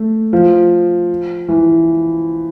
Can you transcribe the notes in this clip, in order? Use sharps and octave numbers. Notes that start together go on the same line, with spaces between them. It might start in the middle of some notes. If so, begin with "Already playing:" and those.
Already playing: A3
F3
E3